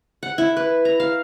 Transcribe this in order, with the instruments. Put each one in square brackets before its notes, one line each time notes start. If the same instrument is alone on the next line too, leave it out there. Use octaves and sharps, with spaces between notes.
[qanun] F#5
E4
B4
A#5
F5